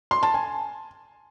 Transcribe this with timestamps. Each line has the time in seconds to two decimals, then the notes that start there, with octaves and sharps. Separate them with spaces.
0.11 C6
0.23 A5
0.34 G#5